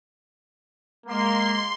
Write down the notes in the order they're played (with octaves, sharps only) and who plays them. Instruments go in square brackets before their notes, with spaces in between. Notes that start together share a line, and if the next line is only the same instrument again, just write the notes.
[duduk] G#3 [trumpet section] A#3 [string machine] C6